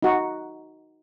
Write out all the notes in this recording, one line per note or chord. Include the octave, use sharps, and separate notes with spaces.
D#4 F#4